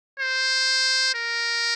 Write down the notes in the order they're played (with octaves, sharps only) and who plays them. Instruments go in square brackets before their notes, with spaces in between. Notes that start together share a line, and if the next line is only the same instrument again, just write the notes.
[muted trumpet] C5
A#4